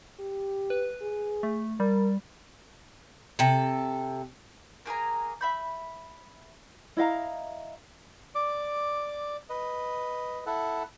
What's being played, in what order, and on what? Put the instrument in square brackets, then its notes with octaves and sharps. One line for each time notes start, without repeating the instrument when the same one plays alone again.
[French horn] G4
[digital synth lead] B4
[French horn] G#4
[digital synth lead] A3
[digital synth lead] G3 [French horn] A#4
[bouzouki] C3 A4
[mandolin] A#3 G#4 G#5 A#5
E5 B5 G6
[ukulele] E4 D#5 F5 A#5
[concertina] D5 D6
B4 D#5
E4 A4 F#5